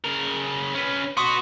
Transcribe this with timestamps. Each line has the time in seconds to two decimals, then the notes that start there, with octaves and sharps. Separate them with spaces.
0.04 C#3 A#4
0.74 C#4 B4
1.17 B3 F#4 C6 C#6 D#6